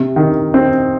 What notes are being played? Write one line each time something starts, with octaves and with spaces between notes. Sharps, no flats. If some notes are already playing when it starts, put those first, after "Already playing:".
Already playing: C3
D#3
C4